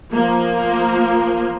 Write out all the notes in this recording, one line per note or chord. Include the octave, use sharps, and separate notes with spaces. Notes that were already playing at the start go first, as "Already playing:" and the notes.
F3 A#3